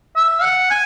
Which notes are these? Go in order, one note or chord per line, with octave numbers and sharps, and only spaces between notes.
E5
F#5
G#5